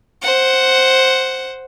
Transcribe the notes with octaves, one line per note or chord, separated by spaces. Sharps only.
C5 F#5